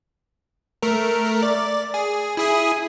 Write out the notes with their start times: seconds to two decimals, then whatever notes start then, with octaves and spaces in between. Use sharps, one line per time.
0.83 A3 A#4
1.43 D5
1.94 G#4
2.37 E4 G#4 D#6